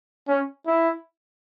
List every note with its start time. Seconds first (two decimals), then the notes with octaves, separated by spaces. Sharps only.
0.28 C#4
0.66 E4